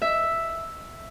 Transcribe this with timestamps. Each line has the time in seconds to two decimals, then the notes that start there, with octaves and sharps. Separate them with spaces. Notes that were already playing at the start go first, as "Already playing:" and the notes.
0.02 E5